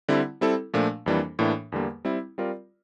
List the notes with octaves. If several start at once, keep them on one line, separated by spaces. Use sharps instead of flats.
D3 G3 C4 E4
G3 C4 E4 A4
A#2 F3 A3 D4
F2 E3 G3 A#3 D4
A2 E3 A#3 D4
E2 D3 G3 A#3
G3 C4 E4
G3 C4 F4 A#4 D5